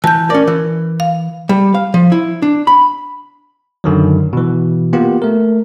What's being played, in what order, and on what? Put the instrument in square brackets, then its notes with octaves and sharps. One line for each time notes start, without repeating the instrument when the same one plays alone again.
[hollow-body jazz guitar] E3 [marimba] A5 G6
[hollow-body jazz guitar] C#4 D5 [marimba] A#4
[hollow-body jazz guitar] E3
[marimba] F5
[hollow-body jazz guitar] G3
F5
F3
E4
D4
B5
[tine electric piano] F#2 D3 D#3 F#3
B2 E3
A#3 B3 F4 G4
A3 A#4